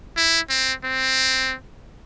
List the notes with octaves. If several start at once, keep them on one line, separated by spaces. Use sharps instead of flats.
E4
C4
C4